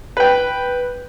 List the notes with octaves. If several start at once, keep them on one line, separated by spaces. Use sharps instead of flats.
B4 G5